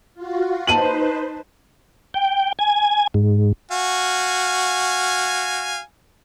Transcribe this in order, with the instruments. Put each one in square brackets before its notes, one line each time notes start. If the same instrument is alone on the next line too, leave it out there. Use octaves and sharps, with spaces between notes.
[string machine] F4 F#4
[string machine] D#4 B4 C5 [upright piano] A5 D#7 F#7
[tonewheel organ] G5
G#5
G#2
[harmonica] F#4 F5 G#5